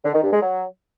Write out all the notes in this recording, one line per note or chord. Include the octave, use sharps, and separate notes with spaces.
D3
D#3
G2
G#3
F#3